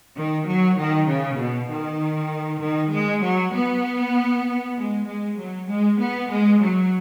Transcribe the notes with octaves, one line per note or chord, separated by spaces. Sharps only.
D#3
F#3
D#3
C#3
B2
D#3
D#3
G#3
F#3
B3
G#3
G#3
F#3
G#3
B3
G#3
F#3